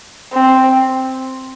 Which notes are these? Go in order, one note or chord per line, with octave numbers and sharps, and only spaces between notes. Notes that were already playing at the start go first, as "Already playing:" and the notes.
C4